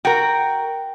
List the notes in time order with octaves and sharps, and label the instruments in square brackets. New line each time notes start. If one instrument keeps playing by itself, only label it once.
[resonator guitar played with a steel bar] F#4 A#4 [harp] G5